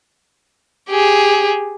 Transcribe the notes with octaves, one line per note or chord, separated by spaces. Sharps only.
G4 G#4